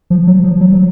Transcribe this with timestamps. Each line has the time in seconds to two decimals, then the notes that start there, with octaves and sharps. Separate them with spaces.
0.10 F3
0.27 F#3
0.44 F3
0.61 F#3
0.72 F#3